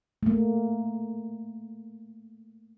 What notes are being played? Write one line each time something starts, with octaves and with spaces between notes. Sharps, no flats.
A3 A#3